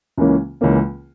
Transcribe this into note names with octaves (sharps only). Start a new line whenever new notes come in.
C#2 C#3 E3 A#3 C#4
C#2 C#3 E3 A#3 C#4